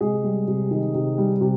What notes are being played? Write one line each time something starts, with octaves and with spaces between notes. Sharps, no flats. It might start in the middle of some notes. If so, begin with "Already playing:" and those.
C3 G#3 G#4
G3
C3
D#3
C3
G3
C3